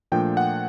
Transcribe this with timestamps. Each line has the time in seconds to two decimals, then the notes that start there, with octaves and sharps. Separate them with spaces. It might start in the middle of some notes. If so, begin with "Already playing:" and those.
0.12 A#2 F3 A3 D4 G5
0.37 F#5